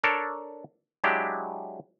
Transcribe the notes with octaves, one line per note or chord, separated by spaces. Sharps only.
D4 A4 A#4 C#5
F#3 G#3 D4 E4 G4